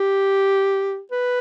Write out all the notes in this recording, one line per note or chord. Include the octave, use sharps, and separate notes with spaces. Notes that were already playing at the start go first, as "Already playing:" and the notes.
Already playing: G4
B4